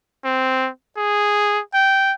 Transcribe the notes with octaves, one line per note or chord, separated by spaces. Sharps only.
C4
G#4
G5